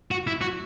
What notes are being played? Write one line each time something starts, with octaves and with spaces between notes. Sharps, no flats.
F#4
E4
F#4